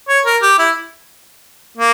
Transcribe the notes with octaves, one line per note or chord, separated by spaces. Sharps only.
C#5
A#4
G4
E4
A#3